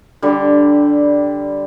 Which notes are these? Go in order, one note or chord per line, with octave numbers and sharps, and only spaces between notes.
D3 G3